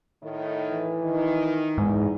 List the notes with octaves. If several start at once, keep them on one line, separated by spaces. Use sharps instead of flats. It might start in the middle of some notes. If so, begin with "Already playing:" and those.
A2 D#3
E3
D#3
E2 G#2